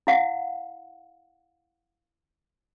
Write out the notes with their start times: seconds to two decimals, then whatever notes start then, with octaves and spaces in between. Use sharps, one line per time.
0.07 E4 F5 F#5